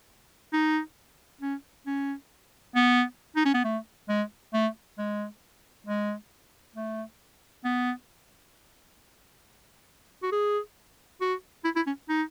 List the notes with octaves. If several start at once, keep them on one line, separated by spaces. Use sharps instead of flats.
D#4
C#4
C#4
B3
D#4
C#4
B3
A3
G#3
A3
G#3
G#3
A3
B3
F#4
G#4
F#4
E4
E4
C#4
D#4